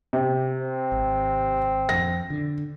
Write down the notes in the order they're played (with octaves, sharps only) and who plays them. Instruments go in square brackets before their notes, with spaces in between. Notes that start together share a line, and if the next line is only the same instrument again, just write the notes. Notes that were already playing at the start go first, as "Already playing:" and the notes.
[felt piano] C3
[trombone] C4
[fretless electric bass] G#1
[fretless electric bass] F2 [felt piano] A#6
[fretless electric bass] D3